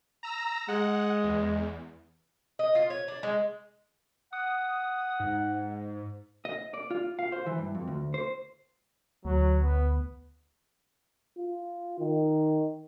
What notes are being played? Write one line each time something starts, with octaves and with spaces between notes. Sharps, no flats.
A#5 E6 A#6
G#3 F#5
E2
D#5
F4
C#5
D4
G#3
F#5 D#6
G#2
D#5
D5
F4
F5
C5
E3
G2
F2
D2
C5
D2 F#3
B3
F4
D#3